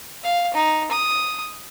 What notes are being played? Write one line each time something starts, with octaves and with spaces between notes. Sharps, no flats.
F5
D#4
D#6